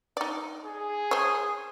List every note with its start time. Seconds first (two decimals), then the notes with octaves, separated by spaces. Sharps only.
0.17 D#4 D5
0.65 G#4
1.11 C5 C#5